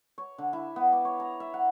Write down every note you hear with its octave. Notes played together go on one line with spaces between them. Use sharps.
C#5
D3
E4
B3
D6
C#5
A#5
E5
F#5